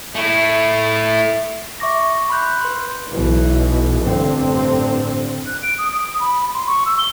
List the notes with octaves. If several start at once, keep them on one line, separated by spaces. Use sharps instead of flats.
A3 E4
E5 C#6 D6 A#6
C#6
B5 C6 F#6 G6
B4 C6
B1 B2 E3
A1 G2 D3 C4
F#6
D7
D#6
D#6
D#6
B5
C6
C#6
E6
G7